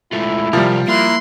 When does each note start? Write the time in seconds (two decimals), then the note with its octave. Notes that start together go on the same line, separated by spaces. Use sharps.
0.12 G#3 A3 E4 F4
0.53 C3 F3 G3 A#4
0.88 A#3 E4 C6 F#6